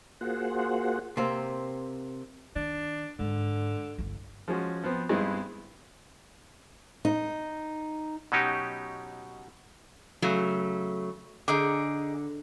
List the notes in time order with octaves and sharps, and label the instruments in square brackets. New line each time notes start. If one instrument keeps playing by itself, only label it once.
[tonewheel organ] A#3 F4 F#4 G#4 C5 F#5
[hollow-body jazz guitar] C3 A#3 C4
[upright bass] D#3 [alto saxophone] D4
[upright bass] G#2 [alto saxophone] D3
[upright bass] G1 F4
[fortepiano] F3 G#3 C#4 F#4
F3 B3 C4
G2 G#3 B3 C4 D#4 E4
[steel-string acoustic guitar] D#4
[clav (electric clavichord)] B2 F#3 C#4 D#4 G4
[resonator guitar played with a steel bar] C#3 F#3 A3
[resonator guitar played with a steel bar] D3 [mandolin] D#4 G#4 D6